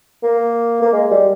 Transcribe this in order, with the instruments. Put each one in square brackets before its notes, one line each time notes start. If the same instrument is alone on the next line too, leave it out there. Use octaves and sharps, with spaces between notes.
[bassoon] A#3
A#3
G#3
G3